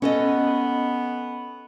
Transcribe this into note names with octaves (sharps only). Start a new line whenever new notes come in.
B3 C#4 A4 D#5